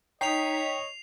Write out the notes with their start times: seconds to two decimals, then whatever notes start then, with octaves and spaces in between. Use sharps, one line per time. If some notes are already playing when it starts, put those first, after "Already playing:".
0.21 D#4 C#5 D#5 G5 B6 C7 F7